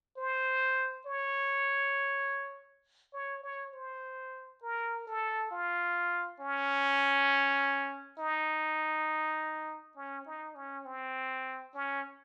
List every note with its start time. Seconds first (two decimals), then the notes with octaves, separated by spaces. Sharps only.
0.17 C5
1.06 C#5
3.14 C#5
3.44 C#5
3.73 C5
4.62 A#4
5.07 A4
5.51 F4
6.40 C#4
8.18 D#4
9.97 C#4
10.26 D#4
10.55 C#4
10.85 C4
11.74 C#4